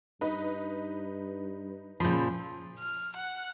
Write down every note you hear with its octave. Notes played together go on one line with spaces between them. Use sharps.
G2 D#4 B4
A#2 C#3 F3 B5 G6
F6
F#5